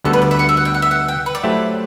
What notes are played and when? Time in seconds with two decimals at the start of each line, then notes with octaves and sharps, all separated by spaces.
0.04 D2 D3 G3 B3 F#4 A4
0.13 B4
0.22 D5
0.31 E5
0.39 F#5
0.49 E5
0.57 F#5
0.65 G5
0.74 F#5
0.82 E5
0.91 F#5
1.08 G5
1.26 B4
1.35 D5
1.43 F#3 A3 E4 G4 C5